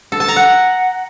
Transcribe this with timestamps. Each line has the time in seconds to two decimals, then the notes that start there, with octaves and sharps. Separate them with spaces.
0.12 A4
0.20 A5
0.28 A#5
0.36 F#5